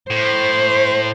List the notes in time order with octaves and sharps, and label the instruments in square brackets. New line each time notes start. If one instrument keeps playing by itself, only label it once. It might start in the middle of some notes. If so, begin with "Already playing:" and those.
[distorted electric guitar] A2 [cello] C5